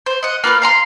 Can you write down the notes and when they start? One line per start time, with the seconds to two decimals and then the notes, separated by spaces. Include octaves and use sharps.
0.06 C5
0.23 D#5 F#5
0.44 A#3 F4 B4 F6
0.62 F5 A#5 C6